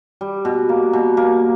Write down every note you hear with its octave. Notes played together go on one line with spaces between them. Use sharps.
G3
B2
A#3
B2
A#3